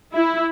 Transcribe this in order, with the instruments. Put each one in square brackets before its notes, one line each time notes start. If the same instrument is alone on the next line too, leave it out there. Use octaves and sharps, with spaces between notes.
[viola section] E4